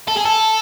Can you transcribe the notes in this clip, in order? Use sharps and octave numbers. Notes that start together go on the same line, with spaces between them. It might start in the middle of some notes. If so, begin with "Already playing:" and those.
A4
G#4
A4